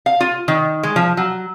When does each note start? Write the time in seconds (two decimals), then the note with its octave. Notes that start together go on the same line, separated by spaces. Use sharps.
0.06 F5
0.20 F4
0.48 D#3
0.83 G#3
0.96 F3
1.17 F#3